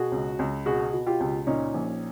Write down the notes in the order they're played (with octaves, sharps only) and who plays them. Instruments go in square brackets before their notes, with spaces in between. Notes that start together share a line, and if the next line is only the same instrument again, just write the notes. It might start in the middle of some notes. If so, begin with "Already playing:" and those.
Already playing: [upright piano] B2 F#4 G#4
C#2
C#2
B2 F#4 G#4
B2
F4 G4
C#2
A#2 C#4 D#4
A#1